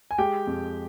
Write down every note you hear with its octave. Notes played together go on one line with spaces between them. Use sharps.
G#5
G#3 G4 G5
F2